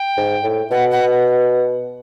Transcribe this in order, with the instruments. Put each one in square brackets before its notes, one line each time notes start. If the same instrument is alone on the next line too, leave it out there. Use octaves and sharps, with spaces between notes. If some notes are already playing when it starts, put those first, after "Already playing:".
Already playing: [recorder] G5
[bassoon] G#2
A2
[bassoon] B2 [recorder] F#5
[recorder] F#5